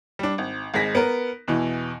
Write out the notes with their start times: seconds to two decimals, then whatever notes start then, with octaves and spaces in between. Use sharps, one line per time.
0.19 G3 D4
0.38 G#1
0.74 G#1 G#3 G#4 A#6 B6
0.95 B3 A#4
1.48 E2 B2 E3